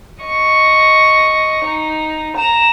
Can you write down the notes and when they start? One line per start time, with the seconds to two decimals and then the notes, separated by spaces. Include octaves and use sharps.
0.23 D#5 C#6
1.65 D#4
2.37 A#5 E7